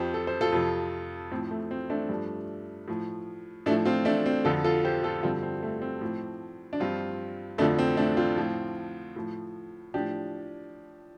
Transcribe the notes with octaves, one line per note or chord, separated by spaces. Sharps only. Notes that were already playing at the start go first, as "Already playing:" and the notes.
Already playing: F2 F3 G4 C5
A4
C5
F4 A4
F2 C3 F3
A2 F3 C4
A3
C4
A3 D4
G2 F3
A2 F3
A2 F3 A3 D4
C4 F4
A3 D4
C4
F2 D3 F3 F4 A4
F4 A4
G4 C5
F4 A4
G2 D3 F3 C4 F4
C4
A3
C4
A2 F3
D4
G2 F3 C4 F4
F2 D3 F3 A3 D4
C4
A3 D4
C4 F4
A2 F3
A2 F3
A2 F3 D4 G4